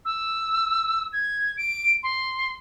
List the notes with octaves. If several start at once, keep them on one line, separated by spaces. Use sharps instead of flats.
E6
G#6
D7
C6